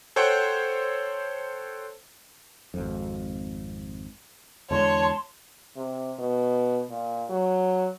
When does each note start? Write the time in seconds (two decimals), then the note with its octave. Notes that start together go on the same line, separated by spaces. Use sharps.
0.16 A4 C5 C#5 F#5 G5
2.74 G#1 F2
4.71 E2 D3 G#3 C#5 A5 C6
5.76 C3
6.19 B2
6.90 A#2
7.30 F#3